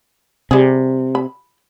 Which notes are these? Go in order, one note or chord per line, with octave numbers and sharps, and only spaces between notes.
C3 G3 G#4
B5